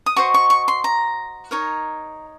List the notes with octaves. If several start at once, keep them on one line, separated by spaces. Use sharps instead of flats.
D#6
F#4 C5 D#5 C#6
C#6
C#6
C6
A#5
D#4 A#4 C#5